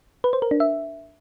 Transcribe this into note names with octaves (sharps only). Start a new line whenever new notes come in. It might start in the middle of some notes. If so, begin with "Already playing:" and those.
B4
C5
A#4
D4
E5